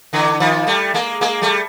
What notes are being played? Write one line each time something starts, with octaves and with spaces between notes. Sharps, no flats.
D3 E3
D#3 F3
G3 A3
G#3 A#3
G#3 A#3
G3 A3